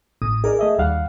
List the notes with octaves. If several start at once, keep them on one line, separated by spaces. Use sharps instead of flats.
A1 A2 D#6
D#4 G#4 A#4 D5
A3 D#5 E5
D#2 G3 F5 F#5